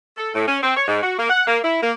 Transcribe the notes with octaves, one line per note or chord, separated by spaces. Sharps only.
A4
A2
C#4
C4
C#5
G#2
F#4
A#3
F#5
A#3
E4
A#3